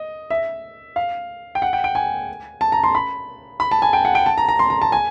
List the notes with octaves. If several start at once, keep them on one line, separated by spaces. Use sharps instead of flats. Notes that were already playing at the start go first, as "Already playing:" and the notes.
Already playing: D#5
E5
F5
G5
F#5
G5
G5
G#5
A5
A#5
C6
B5
B5
A5
G#5
G5
F#5
G5
A5
A#5
A#5
C6
A#5
A5
G#5